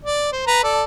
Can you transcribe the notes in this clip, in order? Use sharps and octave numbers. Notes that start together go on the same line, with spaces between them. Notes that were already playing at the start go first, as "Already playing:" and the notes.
D5
C5
B4 A#5
A4 D5